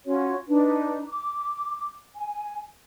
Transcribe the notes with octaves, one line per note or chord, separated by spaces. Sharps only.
C#4 F4 F#4 C#5
D4 D#4 B4
D6
G#5